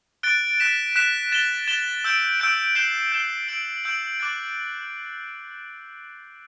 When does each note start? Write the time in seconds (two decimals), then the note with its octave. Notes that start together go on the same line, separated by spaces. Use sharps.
0.23 F#6 A6 D7 G7
0.60 F#6 B6 E7
0.96 F#6 B6 E7
1.32 A6 E7 G7
1.68 A6 E7 G7
2.04 E6 G6 D7
2.40 E6 G6 D7
2.75 G6 C7 E7 G7
3.12 G6 C7 E7 G7
3.48 E6 G6 D7 F#7
3.84 E6 G6 D7 F#7
4.20 D6 F#6 A6